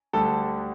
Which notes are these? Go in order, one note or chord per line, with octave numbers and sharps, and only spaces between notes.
D2 D3 G3 A4